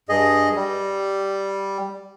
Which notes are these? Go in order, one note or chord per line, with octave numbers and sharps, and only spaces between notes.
G2 G#4 D#5
G3